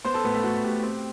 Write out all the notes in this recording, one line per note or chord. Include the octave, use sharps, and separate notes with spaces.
B3 C5 C6
A4 A5
A2 B3 B4
A3 A4
A2 F#4
A2 G4
C4